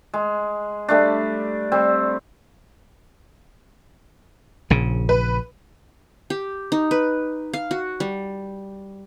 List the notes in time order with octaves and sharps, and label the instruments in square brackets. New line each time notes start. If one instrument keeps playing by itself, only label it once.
[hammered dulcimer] G#3
G3 A3 D4
G3 C4
[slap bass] A#1 C#3
[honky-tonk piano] B4
[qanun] G4
D#4
B4
F5
F#4
G3